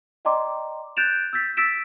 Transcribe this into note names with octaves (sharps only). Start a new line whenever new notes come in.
D5 D#5 G5 A#5 C6 D6
F#6 G6 A6 D7 E7 F7
E6 G6 A6 B6
E6 A6 B6 D7 E7